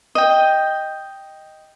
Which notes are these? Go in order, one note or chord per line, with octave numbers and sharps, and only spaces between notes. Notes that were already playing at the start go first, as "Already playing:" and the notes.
D#5 G5